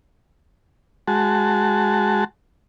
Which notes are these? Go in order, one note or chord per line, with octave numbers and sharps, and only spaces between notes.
G#3 F#4 A5